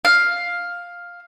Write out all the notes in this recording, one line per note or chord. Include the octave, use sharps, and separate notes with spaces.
F5